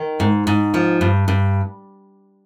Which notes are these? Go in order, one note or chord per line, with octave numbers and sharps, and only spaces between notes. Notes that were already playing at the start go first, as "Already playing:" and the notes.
Already playing: D#3
G#2
G#2
F3
G2
G2